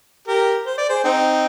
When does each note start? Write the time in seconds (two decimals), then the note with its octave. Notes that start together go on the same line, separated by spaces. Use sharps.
0.28 G4 A#4
0.66 C5
0.78 D5
0.89 G#4 C5
1.04 C4 D#4